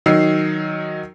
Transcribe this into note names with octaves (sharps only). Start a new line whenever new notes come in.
D#3 F#3 D#4 E6 C7